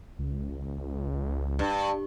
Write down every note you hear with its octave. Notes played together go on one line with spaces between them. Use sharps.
C#2
G2